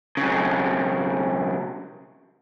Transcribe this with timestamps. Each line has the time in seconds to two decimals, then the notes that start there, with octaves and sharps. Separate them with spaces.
0.17 B1 C#3